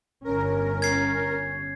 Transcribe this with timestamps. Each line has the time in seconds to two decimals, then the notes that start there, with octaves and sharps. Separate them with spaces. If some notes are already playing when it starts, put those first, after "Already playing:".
0.24 G1 C#4 A#4
0.82 G#6 C7